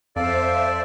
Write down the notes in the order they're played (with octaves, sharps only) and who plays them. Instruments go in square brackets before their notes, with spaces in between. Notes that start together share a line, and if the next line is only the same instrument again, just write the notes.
[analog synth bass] F2 [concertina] A4 D5 [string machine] C5 E5 [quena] F5